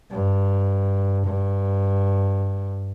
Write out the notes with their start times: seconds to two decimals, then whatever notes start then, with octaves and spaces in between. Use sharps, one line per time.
0.11 G2
1.25 G2